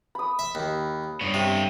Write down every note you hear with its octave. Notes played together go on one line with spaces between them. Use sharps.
B5 D#6
E5
D#2
G2 B3 C#5
C3